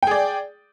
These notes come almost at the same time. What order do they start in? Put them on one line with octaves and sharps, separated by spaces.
G5 G#4 D5